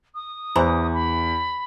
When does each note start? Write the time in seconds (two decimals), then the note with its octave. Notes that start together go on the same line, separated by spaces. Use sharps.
0.15 D#6
0.56 E2 E3 C5 A#5
0.94 B5